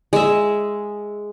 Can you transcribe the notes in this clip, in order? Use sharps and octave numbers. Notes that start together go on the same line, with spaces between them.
G#3 E5